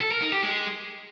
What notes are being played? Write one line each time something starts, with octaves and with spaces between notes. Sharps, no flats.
A4
A#4
D#4
G4
G#3